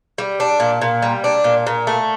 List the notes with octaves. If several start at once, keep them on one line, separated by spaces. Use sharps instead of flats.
G3
D4
A#2
A#2
G3
D4
A#2
A#2
A3